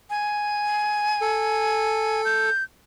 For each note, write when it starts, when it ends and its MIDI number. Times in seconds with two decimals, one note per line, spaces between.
0.10 2.22 80
1.21 2.50 69
2.25 2.64 91